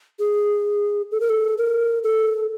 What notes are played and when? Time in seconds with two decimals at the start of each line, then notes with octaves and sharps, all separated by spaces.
0.19 G#4
1.11 A4
1.21 A#4
1.29 A4
1.58 A#4
2.03 A4